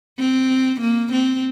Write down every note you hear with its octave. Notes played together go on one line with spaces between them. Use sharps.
C4
A#3
C4